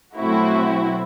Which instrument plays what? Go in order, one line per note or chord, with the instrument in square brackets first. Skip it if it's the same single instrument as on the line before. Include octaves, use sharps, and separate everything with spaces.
[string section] B2 F#3 A3 C4 E4 F#4